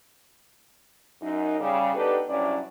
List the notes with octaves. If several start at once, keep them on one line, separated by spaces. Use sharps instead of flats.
F#2 D#4
C#3 G3
B3 D4 D#4 G4 A4 B4
G2 C3 F#3 C#4 E4 D5